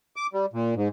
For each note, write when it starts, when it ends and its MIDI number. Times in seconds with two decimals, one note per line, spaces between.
0.16 0.27 86
0.33 0.46 55
0.53 0.74 46
0.76 0.88 44